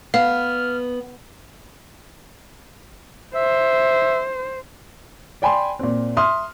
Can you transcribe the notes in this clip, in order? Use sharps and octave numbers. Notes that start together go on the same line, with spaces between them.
B3 F5 F6
C5 E5
D5 G5 G#5 B5 C6
A#2 C4
E5 C6 D#6 F6